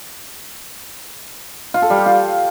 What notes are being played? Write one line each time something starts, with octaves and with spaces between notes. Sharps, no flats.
F4
A4
G3
G4
F4